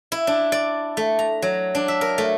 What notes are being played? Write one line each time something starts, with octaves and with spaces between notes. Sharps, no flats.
E4
D4
D5
A3
A#5
F#3
D4
E5
A#4
A3